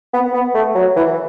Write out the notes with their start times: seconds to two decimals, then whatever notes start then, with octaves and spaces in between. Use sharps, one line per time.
0.13 B3
0.34 B3
0.54 A3
0.75 F#3
0.96 E3